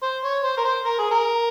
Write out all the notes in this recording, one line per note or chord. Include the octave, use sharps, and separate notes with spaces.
C5
C#5
C5
A#4
C5
A#4
G#4
A#4